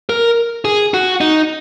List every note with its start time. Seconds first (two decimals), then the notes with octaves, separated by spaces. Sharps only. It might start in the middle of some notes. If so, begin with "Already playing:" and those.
0.09 A#4
0.65 G#4
0.94 F#4
1.21 D#4